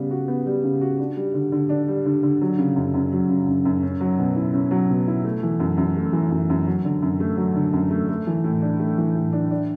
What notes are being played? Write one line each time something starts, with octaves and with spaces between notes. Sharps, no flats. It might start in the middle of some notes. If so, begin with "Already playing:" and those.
Already playing: C#3 G3 B3
F#4
B3
G3
C#3
F#4
D4
G3
D3
D3
D4
G3
D3
D3
F#3
C#3
F#2
F#2
F#3
C#3
F#2
F#2
C#4
F#3
B2
E4
C#4
F#3
B2
E4
A3
E3
F#2
F#2
A3
E3
F#2
F#2
F#3
D3
F#2
A3
F#3
D3
F#2
A3
A3
E3
A2
D4
A3
E3
A2
D4
D4